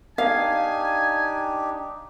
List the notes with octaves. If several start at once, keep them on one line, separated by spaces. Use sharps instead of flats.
D4 D#4 G4 F5 G#5